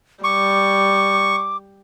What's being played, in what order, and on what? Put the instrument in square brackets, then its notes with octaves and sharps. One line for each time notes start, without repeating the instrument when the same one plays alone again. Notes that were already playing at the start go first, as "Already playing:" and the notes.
[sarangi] G3 [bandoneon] C#6 [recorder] D6